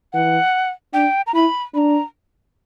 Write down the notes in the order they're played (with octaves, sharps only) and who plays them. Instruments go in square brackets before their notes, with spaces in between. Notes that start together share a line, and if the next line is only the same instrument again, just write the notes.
[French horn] E3 [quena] F#5
[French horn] D4 [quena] G5
[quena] A#5
[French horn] E4 [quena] B5
[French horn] D4 [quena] A#5 B5